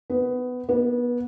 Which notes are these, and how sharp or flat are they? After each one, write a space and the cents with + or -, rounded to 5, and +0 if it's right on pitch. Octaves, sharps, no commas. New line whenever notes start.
B3 +15
B3 -25